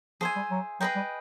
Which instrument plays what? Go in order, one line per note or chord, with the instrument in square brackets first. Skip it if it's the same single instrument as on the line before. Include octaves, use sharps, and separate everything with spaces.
[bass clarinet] F3 [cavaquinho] G#4 C5 E5 G#5
[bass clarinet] G3
F#3
[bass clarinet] F#3 [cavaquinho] G#4 B4 D#5 G5
[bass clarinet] G3